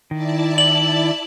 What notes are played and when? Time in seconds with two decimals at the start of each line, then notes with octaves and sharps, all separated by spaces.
0.11 D#3 E4 D5 A5
0.58 F#7